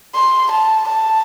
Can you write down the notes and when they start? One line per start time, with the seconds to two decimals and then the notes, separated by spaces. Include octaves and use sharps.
0.15 C6
0.52 A5
0.89 A5